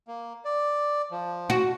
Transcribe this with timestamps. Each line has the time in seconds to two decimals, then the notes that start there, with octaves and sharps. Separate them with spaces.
0.08 A#3
0.45 D5
1.11 F3
1.50 F#4